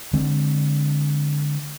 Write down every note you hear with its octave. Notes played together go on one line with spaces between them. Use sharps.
D3 G#3 C4